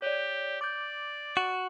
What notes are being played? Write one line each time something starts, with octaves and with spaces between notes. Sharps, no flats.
G4 C#5 D5
D5 D6 G6
F#4